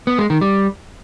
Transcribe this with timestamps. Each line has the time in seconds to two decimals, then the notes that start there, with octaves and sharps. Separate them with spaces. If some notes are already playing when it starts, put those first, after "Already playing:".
0.07 B3
0.19 G#3
0.30 D#3
0.41 G3